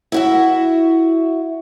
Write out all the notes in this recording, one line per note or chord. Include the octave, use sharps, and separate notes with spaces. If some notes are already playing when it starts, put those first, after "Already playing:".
E4 F#4 E5